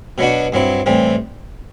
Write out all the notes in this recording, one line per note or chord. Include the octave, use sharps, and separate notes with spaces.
B2 F#3 B3 D4 F#4
G2 F#3 C4 E4
A2 E3 G3 C4